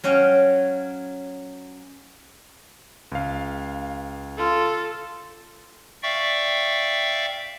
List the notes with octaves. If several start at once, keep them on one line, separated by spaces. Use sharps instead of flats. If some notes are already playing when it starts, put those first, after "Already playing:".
F#3 C#4 C#5 F5 G5
C#2 F5
F4 A4
D5 E5 F5 G5 C#6